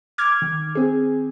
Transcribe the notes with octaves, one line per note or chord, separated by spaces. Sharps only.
D6 F6 G#6
D#3
C4 G#4